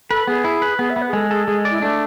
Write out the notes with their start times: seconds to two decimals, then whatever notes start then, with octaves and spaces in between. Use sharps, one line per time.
0.10 A4 B4
0.27 B3 G#4
0.44 E4
0.62 B4
0.79 B3 G#4
0.90 E5
0.96 B3
1.02 B4
1.08 G#4
1.13 G#3 A4
1.31 G#4 A4
1.47 G#3 G#4
1.65 D5
1.70 E4
1.81 A3 D4